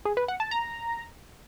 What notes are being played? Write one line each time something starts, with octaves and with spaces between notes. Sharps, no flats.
G#4
B4
F#5
A5
A#5